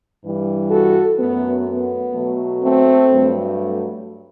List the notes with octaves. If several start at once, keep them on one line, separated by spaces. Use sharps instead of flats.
G2 E3 G3
F#4 A4
F#2 F#3 A3 B3
B3
B2 F#3 A3
A3 C4
G2 F#3 A3